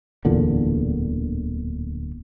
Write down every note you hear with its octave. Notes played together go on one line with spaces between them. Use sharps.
D1 E2 A#2 D3